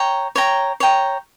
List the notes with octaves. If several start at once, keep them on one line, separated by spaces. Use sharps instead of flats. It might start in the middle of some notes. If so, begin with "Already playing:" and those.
Already playing: C#5 G5 A#5
C#5 G5 A#5
C#5 G5 A#5